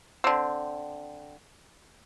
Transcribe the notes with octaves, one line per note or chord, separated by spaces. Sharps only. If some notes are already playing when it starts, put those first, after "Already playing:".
D3 C4